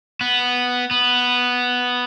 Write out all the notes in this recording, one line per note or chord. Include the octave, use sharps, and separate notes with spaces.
B3
B3